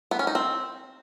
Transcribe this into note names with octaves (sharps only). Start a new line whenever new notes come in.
B3
C#4
D#4
C4